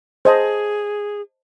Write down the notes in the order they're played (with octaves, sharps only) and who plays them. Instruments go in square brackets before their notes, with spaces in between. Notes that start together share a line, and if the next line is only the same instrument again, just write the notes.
[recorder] G#4 [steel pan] C5 D#5 A5